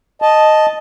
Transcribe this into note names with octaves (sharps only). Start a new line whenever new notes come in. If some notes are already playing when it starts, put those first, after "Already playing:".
D#5 A5